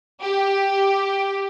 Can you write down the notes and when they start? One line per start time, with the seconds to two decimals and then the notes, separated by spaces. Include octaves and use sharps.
0.21 G4